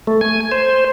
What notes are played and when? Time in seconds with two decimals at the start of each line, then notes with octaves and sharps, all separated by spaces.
0.07 A3
0.21 G#5
0.52 C5